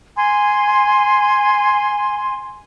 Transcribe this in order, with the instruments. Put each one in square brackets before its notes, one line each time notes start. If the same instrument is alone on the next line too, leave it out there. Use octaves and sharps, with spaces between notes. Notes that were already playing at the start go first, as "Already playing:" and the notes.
[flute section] G#5 C6